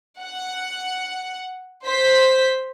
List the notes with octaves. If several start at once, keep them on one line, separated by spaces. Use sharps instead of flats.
F#5
C5 B6